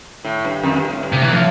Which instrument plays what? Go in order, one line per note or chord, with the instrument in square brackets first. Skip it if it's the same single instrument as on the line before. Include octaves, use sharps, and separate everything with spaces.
[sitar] A2
G2
F2
G2
A2
G2
[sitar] A2 [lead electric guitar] C3
[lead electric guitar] E3
[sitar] A2 [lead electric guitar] F3